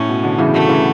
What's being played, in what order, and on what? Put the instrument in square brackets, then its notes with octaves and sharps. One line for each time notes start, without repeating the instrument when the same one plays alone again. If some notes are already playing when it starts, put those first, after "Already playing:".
Already playing: [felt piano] A2 [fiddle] C#4
[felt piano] B2
B2 D3
C#3 E3
[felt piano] D3 F#3 [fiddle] A3
[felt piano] C#3 E3